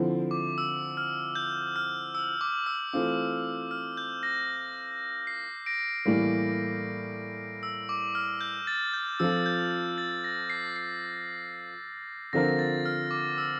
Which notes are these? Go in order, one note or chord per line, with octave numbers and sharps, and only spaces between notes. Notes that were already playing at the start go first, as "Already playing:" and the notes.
Already playing: D3 F3 C4 E4
D6
E6
F6
G6
F6
E6
D6
E6
E3 A3 C4 F4 D6
F6
G6
A#6
C7
A#6 D7
A2 E3 G3 A#3
E6
D6
F6
G6
A6
G6
F3 C4 F4 A4 E6
G6
A6
A#6
C7
C7
D3 F3 C4 F4 A#4 A#6
A6
F6
D6
E6